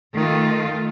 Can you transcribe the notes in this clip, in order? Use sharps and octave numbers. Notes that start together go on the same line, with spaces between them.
D#3 A3 F4